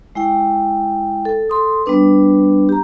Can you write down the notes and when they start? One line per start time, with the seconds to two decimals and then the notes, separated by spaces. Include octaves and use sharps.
0.15 G#3 E4 G5
1.25 A4
1.50 A4 C6 D#6
1.86 G3 B3 D4 B4
2.69 G4 A#5